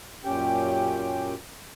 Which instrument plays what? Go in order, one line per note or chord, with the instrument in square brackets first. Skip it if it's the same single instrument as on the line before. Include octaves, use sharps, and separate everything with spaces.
[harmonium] F#2 A#2 C#4 G4 G5